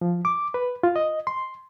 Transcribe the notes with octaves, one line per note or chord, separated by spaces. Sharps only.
F3
D6
B4
F4
D#5
C6